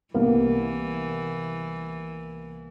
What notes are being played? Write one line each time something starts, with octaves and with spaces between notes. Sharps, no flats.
C2 E3 A#3 B3